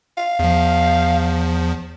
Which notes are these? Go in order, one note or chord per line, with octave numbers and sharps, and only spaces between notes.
F5
E2 F3